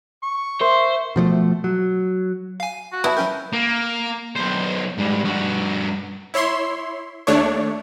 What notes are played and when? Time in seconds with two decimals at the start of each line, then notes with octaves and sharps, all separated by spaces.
0.24 C#6
0.61 A#4 C5 E5 C6
1.16 B2 F3 G#3 A3
1.64 F#3
2.60 F5 G#5
2.92 F#4
3.04 B3 E4 A5
3.17 F#3 C#4 A#4 G5
3.53 A#3
4.36 B1 C5
4.98 G#2 G3
5.24 G2 F#4
6.34 E4 C#5 E5 C6
7.27 D#2 A3 D4 C#5